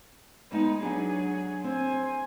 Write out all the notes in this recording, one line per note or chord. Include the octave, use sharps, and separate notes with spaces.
G#3 B3 D#4 A5
F#3 D4 G#4
C4 C5 G#5